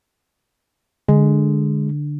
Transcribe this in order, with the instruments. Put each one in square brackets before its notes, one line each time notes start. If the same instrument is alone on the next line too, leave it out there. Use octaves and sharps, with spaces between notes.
[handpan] D3 [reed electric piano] G#3